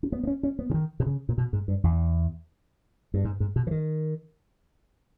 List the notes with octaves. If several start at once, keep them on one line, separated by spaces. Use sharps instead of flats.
C#4
B3
B3
C#4
C#4
B3
C#3
D#3
B2
C#3
A#2
B2
G#2
G2
E2
G2
G#2
G#2
B2
E3
D#3